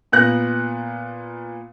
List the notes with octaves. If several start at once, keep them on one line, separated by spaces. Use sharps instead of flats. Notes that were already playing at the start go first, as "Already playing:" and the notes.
A#2 B3 F#6 A#6